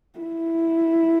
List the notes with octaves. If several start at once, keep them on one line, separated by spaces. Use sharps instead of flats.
E4